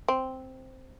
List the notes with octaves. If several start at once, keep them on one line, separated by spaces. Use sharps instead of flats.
C4